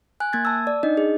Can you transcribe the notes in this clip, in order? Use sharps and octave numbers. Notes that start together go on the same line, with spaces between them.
G#5 F#6
A#3 G#6 A6
A5 E6
D5
D4 D#4 D#5
G#4